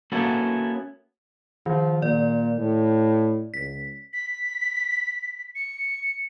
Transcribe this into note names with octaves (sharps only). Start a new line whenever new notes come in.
A#3 B3 C#4 E4 F#4 A4
D#3 F3
A#2 D5
A2
C#2 B6
B6
C#7